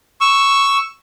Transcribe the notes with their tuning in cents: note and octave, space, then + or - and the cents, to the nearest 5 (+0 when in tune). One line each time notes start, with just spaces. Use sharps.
C#6 +0 E6 +0